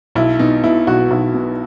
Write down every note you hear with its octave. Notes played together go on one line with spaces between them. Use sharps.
B1 E4
B2 D#4
B2 E4
B1 F#4
B1
B2